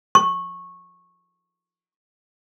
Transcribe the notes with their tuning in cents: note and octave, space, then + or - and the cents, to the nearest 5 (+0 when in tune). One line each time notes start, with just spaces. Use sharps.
C#6 -15